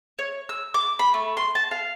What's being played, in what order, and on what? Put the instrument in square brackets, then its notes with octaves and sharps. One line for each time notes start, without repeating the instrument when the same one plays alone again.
[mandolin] C#5
E6
D6
B5
A3
C6
A5
F5